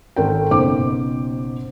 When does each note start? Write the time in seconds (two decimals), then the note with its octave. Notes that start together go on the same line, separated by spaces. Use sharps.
0.16 G#1 A4 A#4 G5
0.51 F#1 B2 D#4 C5 D6